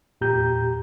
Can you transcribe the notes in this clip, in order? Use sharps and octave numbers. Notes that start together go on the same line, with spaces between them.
E2 A#2 G4 A#5 G6